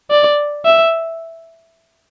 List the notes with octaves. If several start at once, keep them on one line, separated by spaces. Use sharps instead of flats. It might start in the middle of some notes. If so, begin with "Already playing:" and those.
D5
E5